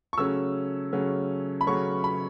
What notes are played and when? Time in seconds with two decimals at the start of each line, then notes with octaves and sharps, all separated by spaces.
0.13 C#6
0.18 C#3 F#3 A3 C#4 E6
0.93 C#3 F#3 A3 C#4
1.61 B5
1.67 C#3 F#3 A3 C#4 C#6
2.04 B5